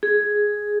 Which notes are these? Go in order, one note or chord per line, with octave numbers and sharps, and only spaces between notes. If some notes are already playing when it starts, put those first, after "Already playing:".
G#4